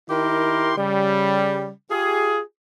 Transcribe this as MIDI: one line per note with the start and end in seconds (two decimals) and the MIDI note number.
0.10 0.73 51
0.10 0.73 64
0.10 0.73 67
0.10 0.73 70
0.10 0.73 84
0.78 1.72 49
0.78 1.72 55
1.91 2.41 65
1.91 2.41 67
1.91 2.41 68